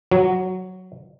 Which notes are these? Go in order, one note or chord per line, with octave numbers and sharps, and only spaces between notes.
F#3